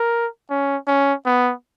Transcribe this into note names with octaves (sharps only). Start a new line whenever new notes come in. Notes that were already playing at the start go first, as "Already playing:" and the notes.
Already playing: A#4
C#4
C#4
B3